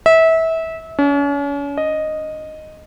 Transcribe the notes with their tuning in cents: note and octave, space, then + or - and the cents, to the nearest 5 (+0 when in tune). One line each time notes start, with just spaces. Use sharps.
E5 -25
C#4 +40
D#5 -5